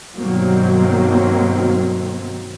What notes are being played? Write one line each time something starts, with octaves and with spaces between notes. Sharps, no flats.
G2 B2 D#3 F#3 A#3 C4